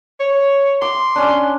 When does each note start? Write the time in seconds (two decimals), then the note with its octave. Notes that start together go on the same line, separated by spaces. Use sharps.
0.20 C#5
0.82 C6 D6
1.15 C#4 D4